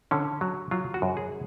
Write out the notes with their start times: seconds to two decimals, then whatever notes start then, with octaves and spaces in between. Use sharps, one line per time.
0.11 D3 C#4
0.41 F#3
0.71 F#3 F4
0.94 F#4
1.02 F#2
1.17 G#4